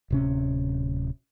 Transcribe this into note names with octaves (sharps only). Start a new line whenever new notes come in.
D1 C3 C#4